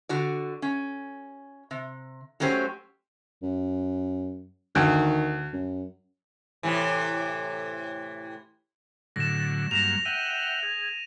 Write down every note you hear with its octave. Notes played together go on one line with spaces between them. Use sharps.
D3 F#4 D5
C#4
C3
F#3 A3 C#4 G4 C5
F#2
D2 D#3
F#2
A2 C3 E3
A2 D3 F#3 A#6 E7
G2 F#3 A#3 A#6 E7 F7
E5 F#5 G5 D#7
G#4